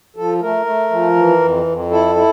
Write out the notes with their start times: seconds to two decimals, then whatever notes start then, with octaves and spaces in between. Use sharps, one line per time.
0.16 F3 A4
0.41 A3 A#4
0.66 A3
0.91 F3
1.16 E3
1.41 F2
1.66 F2
1.91 E4 A4
2.16 E4